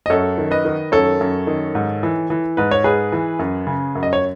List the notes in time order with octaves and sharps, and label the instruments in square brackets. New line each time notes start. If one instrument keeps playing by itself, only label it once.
[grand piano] D#5
F#2 A4 C#5
D#3
B4 D#5
D#3
F#2 A4 C#5
F#2
D#3
G#2
E3
E3
G#2 B4
C#5
G#2 G#4 B4
E3
F#2
C#3
F#2
D#5
C#5